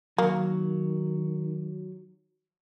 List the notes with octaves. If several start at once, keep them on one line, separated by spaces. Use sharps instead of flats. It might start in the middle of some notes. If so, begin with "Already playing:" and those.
D#3 F#3 A#3